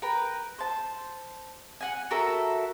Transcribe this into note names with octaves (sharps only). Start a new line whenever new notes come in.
A#4 B4 G5
C5 A5
F#5 G#5
F#4 A4 A#4 E5